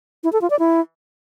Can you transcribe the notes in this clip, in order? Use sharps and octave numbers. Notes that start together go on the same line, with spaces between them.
E4
A4
F4
D5
E4